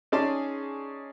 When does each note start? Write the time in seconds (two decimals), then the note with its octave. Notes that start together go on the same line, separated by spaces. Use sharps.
0.12 C#4 D#4 G#4 D5 A5 C6